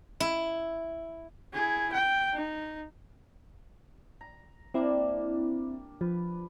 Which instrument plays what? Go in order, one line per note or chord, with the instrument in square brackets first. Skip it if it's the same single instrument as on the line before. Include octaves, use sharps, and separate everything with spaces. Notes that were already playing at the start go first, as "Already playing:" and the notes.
[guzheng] E4
[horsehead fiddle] E4 G#4
G5
D#4
[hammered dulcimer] A#5
[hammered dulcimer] G3 A#3 D4 [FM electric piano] C4 E4
[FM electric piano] F3 [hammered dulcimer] B4